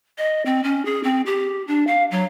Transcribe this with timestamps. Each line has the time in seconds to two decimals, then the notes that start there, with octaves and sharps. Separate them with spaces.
0.18 D#5
0.46 C4
0.64 C#4
0.85 G#4
1.04 C4
1.26 G4
1.68 D4
1.87 F5
2.11 F#3